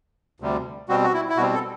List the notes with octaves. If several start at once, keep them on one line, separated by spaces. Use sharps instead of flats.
D2 C3 G3
B2 G3 C4 F#4
F#4
E4
E4
B2 G3 C4 F#4
A4